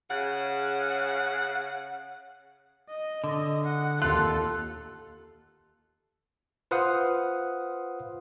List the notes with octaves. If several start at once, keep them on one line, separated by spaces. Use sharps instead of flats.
C#3 F#5
D#5
D3
F#5
D#2 F4 A4 F#6
F4 B4 C5 F5 F#5 D#6